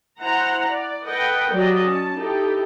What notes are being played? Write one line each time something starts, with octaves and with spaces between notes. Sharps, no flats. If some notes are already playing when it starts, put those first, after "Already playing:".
E4 C5 F#5 A#5
D5
A4 B4 D#5 F#5 G5
F#3 G4 D5 D#5
C#4 A5
D#4 E4 G4 A4